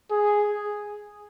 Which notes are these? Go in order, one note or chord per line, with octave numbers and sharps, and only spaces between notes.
G#4